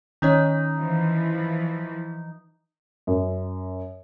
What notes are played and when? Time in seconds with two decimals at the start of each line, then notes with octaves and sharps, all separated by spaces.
0.22 D#3 C#4 D#4 C#5
0.78 E3 F3
3.07 F#2